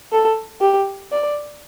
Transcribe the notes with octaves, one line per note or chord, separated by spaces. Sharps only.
A4
G4
D5